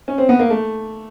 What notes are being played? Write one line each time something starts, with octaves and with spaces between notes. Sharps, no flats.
C#4
C4
B3
A#3
A3